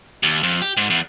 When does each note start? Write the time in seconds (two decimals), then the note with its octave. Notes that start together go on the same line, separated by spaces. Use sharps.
0.23 D#2
0.43 F2
0.62 G4
0.77 G#2
0.90 E2